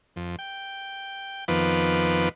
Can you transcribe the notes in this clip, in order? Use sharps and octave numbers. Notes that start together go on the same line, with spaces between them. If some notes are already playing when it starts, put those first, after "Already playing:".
F2
G5
F2 D#3 F3 B3 B4 D6